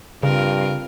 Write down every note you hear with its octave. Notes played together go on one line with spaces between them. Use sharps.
G2 C#3 C4 F4 A#4